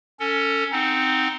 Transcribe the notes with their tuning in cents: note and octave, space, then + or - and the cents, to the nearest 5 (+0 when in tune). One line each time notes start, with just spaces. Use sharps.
C#4 +10 A4 +25
C4 -5 D#4 +0 F#5 -5